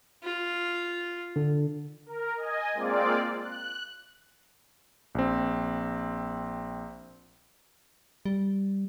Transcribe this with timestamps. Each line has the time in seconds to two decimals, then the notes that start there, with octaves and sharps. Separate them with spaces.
0.23 F4
1.36 D3
2.06 A#4
2.37 D#5 G#5
2.73 G#3 A#3 C4 F4 D5
3.41 F#6
5.15 A#1 C4
8.26 G3